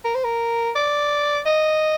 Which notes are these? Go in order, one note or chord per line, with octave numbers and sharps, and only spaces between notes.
A#4
C5
A#4
D5
D#5